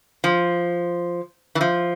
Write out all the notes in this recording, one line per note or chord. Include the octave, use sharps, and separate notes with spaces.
F3
E3
F3